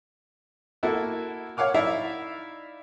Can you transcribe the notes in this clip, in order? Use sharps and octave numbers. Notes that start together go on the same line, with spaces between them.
A#3 E4 F#4 A4
C#5 F5 F#5 D6 F6
D#4 E4 D5 E5 F5